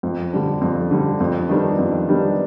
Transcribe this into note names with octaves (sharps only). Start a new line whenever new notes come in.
F2
D3 G3 D4
F2
D3 G3 D4
F2
D#3 G3 B3 D4
F2
D#3 G3 B3 D4